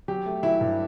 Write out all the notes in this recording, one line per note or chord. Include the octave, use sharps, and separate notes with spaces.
F#3 G4
A3
F#3 E4
G2